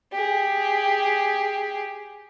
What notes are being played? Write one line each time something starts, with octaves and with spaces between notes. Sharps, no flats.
G4 G#4